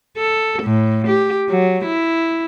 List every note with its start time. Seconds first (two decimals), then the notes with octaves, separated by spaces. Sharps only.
0.18 A4
0.63 A2
1.08 G4
1.50 F#3
1.85 E4